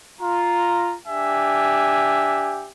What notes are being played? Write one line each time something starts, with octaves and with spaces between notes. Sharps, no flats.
F4 A#5
D4 G4 E5 G#5